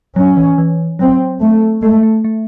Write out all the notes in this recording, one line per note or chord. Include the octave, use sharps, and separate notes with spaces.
F#3 C#4
E3
E3
F#3 C4
A3
G#3 A3
A3
A3